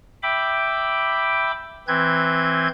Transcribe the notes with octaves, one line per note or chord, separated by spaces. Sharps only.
E5 G5 B5 D6
E3 C4 B4 G6 G#6